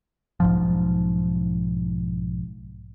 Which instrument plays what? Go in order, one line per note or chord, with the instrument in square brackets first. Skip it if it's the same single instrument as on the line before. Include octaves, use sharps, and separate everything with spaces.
[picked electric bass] B1 G#2 F3